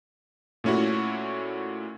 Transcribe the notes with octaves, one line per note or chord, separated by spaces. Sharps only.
A#2 A3 C#4 E4 F#4